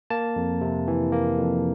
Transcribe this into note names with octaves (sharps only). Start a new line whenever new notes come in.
A#3 A5
F2
C3
E3
A#3
F2